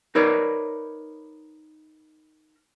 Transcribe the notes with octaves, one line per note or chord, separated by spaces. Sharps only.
D#4 A#4 B4 C#5 D5